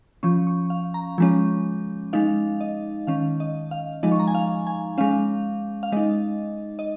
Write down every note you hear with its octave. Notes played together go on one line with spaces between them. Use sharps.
F3 C#4 C#6
C#6
F5
A#5
F3 G#3 C#4
G#3 D#4 F5
D#5
D#3 C#4 F5
D#5
F5
F3 G#3 D#4 D#5
C#6
A#5
G#5
F5
G#5
G#3 C#4 F5
F5
G#3 D#4 D#5
D#5